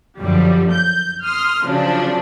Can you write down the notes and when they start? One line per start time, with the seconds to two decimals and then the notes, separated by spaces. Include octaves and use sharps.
0.20 F#2 D3 F3 G3
0.71 G6
1.23 C6 D#6 F6
1.65 C#3 F3 F#3 D4